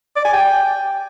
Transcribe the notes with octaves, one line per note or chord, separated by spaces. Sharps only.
D5
G#5
G5